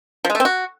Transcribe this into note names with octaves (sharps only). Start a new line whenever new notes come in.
F3
G#3
A3
C4
F#4